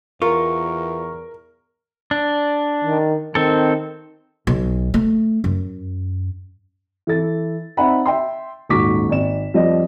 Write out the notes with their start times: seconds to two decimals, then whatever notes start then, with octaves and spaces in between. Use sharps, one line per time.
0.22 E2 F4 A#4 C#6
2.11 D4
2.84 D#3
3.35 D#3 C4 A4
4.47 B1
4.94 A3
5.44 F#2
7.07 E3 A4 A6
7.77 C4 D#4 D5 E5 F#5 B5
8.06 E5 G5 C6
8.69 D#1 G#2 F#4 C#6 D6 B6
9.09 G#1 D5 E7
9.54 F2 F3 G3 D5 D#5